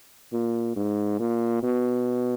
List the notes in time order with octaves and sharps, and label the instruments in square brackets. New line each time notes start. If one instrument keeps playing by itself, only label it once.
[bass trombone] A#2
G#2
A#2
B2